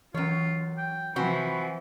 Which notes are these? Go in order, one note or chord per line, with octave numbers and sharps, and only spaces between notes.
E3 F#3 C#4 F4 C#5
G5
C3 E3 F3 C4 F#4 B4 G#5 C#6